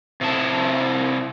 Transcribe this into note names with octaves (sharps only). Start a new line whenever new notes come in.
C3 E4 A5